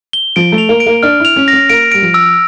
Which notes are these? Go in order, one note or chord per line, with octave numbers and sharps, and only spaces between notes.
G7
F3 D7
A3
F7
A#3
D7
A#3
D4 F6
E4 F7
C#4
A#6
C#4
A#3 D7
G3 D7
F3
E6